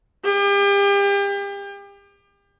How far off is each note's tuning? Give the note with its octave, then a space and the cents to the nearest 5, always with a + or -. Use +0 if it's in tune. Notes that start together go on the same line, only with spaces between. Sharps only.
G4 +35